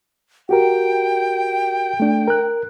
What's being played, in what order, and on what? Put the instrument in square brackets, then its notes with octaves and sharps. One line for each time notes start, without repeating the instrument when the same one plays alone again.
[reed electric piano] F#4 G4 A#4 [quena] G5
[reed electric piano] A3 D4
A#4 F#6